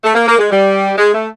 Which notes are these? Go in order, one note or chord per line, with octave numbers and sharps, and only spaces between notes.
A3
A#3
A#3
G#3
G3
G#3
A3